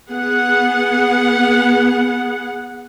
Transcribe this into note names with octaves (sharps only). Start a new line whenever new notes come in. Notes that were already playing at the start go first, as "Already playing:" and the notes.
B3 G#4 F#5